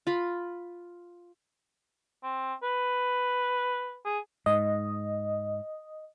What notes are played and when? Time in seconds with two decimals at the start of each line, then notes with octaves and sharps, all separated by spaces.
0.07 F4 B5
2.23 C4
2.63 B4
4.05 G#4
4.46 G#2 D#5